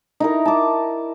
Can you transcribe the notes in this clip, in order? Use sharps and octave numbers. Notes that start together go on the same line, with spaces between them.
D#4 E4 A#4
A5 D6